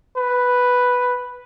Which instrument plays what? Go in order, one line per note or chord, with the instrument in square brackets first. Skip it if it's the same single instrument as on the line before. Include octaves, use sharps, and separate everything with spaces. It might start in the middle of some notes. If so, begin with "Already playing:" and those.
[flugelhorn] B4